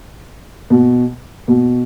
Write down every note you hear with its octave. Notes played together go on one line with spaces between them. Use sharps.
B2
B2